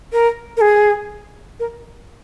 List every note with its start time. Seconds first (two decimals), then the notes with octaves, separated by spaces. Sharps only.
0.13 A#4
0.57 A#4
0.61 G#4
1.60 A#4